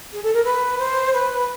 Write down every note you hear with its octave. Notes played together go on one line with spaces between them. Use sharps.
G#4
A4
A#4
B4
C5
B4